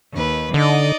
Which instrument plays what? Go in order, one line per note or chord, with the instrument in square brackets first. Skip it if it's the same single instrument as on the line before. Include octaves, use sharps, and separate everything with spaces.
[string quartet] D#2 B4
[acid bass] D3 [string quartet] D#4 D5 D#5